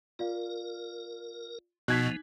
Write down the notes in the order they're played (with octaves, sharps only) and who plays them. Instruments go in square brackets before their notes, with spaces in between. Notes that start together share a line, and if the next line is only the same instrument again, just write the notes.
[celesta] F4 D5 F5 [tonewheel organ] A#4
[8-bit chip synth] B2 [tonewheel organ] F3 B3 [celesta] D#4 [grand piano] F#6 G#6 B6